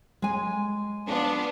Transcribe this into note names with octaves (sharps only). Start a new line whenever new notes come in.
G#3 G#5
B3 D4 F4